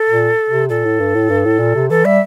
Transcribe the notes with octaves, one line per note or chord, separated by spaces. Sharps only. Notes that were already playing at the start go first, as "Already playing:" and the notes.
Already playing: A4
A#2
C3
A#2 A4
A2
G2
A2
G2
A2
A#2
C3
E3 A4
G3 E5